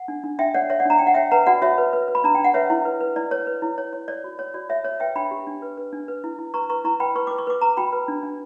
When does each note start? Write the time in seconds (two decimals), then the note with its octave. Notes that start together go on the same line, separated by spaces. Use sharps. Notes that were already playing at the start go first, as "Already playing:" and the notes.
Already playing: F#5
0.08 D4
0.24 D4
0.39 D4 E5 G5
0.54 C#5 D5 F#5
0.70 C#5 E5
0.80 D5 F#5
0.85 D4 A#5
0.99 D4 G5
1.07 F#5
1.14 C#5 E5 G5
1.31 B4 F#5 A#5
1.46 F#4 D5 F#5
1.62 F#4 C#5 E5
1.78 B4
1.93 B4
2.08 B4
2.15 B5
2.24 D4 A#5
2.35 D4 G5
2.44 F#5
2.54 B4 C#5 E5
2.70 E4
2.85 B4
3.01 B4
3.16 E4 D5
3.31 B4 C#5
3.47 B4
3.62 E4
3.78 C#5
3.93 C#5
4.08 C#5 D5
4.24 F#4
4.39 C#5
4.54 F#4 D5
4.70 C#5 E5
4.84 C#5
5.00 B4 E5 G5
5.15 D4 G5 B5
5.31 G4
5.47 D4
5.62 B4
5.77 B4
5.93 D4
6.08 B4
6.24 E4
6.39 E4
6.54 B4 A#5 C#6
6.69 B4 A#5 C#6
6.85 E4 A#5 C#6
7.00 B4 G5 B5
7.16 B4 C#6
7.27 B4 D6
7.38 C#6
7.47 B4 D6
7.61 B4 A#5 C#6
7.77 F#4 G5 B5
7.93 B4
8.08 D4
8.23 D4